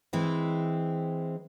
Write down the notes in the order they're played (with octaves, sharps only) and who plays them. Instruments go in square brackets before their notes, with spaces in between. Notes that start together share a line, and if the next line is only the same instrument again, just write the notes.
[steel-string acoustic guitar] E3 G#3 C4 E4